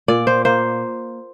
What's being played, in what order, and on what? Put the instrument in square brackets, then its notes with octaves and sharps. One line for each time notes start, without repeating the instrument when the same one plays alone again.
[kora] A#2 D5
C5
A#3 C5